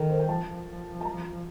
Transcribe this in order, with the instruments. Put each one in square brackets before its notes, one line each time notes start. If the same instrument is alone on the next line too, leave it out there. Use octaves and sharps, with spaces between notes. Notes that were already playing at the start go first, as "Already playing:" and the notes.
Already playing: [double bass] D#3 [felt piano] A4 A#4
[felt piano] C5
G5
[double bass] F3 [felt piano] A5
[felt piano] A5
A#5